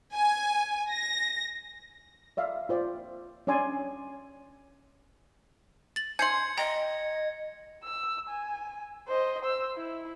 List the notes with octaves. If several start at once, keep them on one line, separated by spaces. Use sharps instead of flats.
G#5
A#6
D5 E5 F5
F4 C5 D5
C#4 D4 D5 G#5 C6
A6 F#7
G#5 C6 G6 G#6 C7 C#7 F#7
D#5 G5 A#5
E6
G#5
C5 D#5
C5 E6
E4